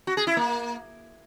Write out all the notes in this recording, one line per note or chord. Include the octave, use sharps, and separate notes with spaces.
F#4
G#4
E4
A#3